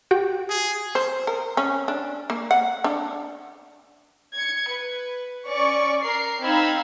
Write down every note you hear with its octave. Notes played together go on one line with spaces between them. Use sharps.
F#4 G4 G5
G#4
C5
A#4
C#4
D4
A#3
F#5
D4
G#6 C#7
B4
C#4 D5 C#6
A#4 C7
C4 D#4 F5 B5 E6 G#6